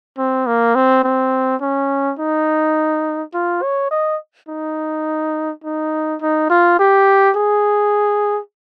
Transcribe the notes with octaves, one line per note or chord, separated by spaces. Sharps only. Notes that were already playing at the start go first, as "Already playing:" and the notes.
C4
A#3
C4
C4
C#4
D#4
F4
C#5
D#5
D#4
D#4
D#4
F4
G4
G#4